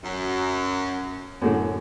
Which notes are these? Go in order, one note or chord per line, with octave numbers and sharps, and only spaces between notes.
F#2
F#2 A2 D3